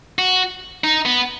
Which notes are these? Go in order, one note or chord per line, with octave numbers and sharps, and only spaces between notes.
F#4
D#4
B3